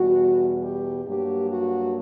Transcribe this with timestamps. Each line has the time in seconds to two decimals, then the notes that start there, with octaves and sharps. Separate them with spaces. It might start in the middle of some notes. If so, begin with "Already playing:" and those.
Already playing: E2 B2 G3 F#4
0.64 G4
1.06 G2 F#3 A#3 G4
1.49 F#4